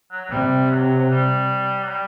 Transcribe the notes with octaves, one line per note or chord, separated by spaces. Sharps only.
F#3
F#3
C3 G3
F#3
G3
F#3
G3